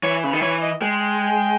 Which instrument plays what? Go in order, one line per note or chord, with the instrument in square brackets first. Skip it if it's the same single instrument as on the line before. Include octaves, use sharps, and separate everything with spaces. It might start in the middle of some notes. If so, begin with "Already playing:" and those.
[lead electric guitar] E3 [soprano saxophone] C#5
[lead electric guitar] C#3 [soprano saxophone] B4
[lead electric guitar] D#3
[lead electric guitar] E3 [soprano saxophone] C#5
[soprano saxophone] D#5
[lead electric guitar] G#3 [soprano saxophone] G5